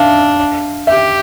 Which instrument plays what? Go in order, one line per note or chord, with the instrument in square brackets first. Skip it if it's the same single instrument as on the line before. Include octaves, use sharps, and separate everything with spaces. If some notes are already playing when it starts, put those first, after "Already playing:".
Already playing: [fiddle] D4 [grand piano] E5 F5
[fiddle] G4 [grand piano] E5